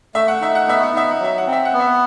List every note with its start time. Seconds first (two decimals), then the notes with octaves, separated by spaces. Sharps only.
0.15 A3 E5
0.28 F#5
0.41 D#4 E5
0.55 F#5
0.68 B3 E5
0.83 F#5
0.94 D#4 E5
1.11 F#5
1.20 F#3 E5
1.38 F#5
1.47 C4
1.52 E5
1.65 F#5
1.73 B3
1.80 E5